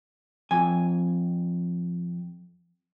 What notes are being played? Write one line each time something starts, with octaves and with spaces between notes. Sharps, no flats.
F2 G#5